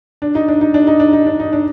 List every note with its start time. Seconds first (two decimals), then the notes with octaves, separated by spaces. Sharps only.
0.22 D4
0.35 D#4
0.48 D4
0.61 D#4
0.74 D4
0.87 D#4
1.00 D4
1.13 D#4
1.26 D4
1.40 D#4
1.53 D4